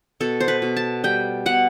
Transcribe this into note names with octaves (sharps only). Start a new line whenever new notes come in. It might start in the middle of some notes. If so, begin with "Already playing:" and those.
B2 A4
C5
B4
B2
A5
G3 G5
B2 F#5